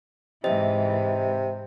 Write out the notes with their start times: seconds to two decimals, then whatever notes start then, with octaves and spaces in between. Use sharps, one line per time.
0.44 G#2 C3 E3 D#5 E5